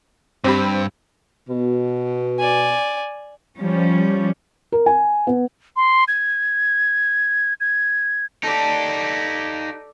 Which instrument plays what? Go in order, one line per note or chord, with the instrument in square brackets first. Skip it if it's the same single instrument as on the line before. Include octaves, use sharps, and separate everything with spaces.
[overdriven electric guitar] G2 [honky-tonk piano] C4 G4 B5
[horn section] B2
[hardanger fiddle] D5 G#5
[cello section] F3 G3 C#4
[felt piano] A#4
G#5
B3
[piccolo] C6
G#6
G#6
[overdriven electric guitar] D#4 G4 [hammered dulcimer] A4 D5